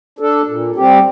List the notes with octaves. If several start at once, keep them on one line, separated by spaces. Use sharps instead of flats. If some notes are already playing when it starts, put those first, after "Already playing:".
D4 A4
A#2
G3 C4 G4